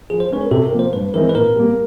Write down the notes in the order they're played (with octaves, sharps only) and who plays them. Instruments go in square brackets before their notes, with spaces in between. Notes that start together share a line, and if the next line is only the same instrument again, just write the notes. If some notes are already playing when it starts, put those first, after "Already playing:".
[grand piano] F3 [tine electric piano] G#4
[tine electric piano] C5
[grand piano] G#3 C#4 [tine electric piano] B4
[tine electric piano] A#4
[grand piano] C3 [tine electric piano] A4
[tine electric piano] A#4
[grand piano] F3 A#3
[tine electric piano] C5
[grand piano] G2 [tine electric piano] B4
[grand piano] E3 G#3 C4 D#4 [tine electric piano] A#4
[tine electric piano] B4
[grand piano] A#2 [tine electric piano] A#4
[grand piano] G3 A#3